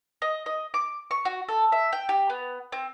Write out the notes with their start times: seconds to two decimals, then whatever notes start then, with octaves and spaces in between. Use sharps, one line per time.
0.22 D#5
0.46 D#5
0.74 D6
1.11 C#6
1.25 F#4
1.49 A4
1.72 E5
1.93 G5
2.09 G4
2.30 B3
2.72 C4